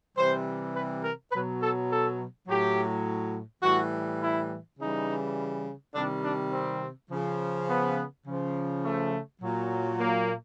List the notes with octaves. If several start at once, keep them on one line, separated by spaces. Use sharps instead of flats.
C3 E3 G3 C5
B4
A#4
B2 F#3 B4
A4
A4
A2 F#3 G4
A2 E3 G3 F#4
E4
C#3 E3 G3 D#4
C3 D#3 G3 D4
D4
C4
C#3 F3
B3
C#3 F3
A3
A#2 F#3
A#3